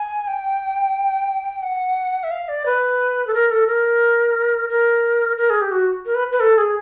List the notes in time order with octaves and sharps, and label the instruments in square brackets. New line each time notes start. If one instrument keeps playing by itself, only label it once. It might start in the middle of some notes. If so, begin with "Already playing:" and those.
Already playing: [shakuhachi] G#5
G5
F#5
E5
F5
D5
B4
A4
A#4
A4
A#4
A#4
A#4
G#4
G4
F#4
A#4
B4
B4
A4
G#4